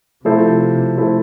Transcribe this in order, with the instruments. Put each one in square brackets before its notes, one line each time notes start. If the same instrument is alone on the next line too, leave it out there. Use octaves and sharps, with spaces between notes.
[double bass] C3 [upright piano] F3 A3 E4 A4 C5
[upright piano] F3 A3 E4 A4 C5